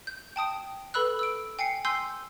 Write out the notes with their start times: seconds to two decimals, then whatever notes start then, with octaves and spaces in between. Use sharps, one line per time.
0.07 G6
0.36 G5 A5 D#6 D7
0.94 A4 B4 B5 E6 F#6
1.19 E6 D7
1.59 G5 G#5 C7 C#7
1.85 G#5 C6 E6 G6 C7 G7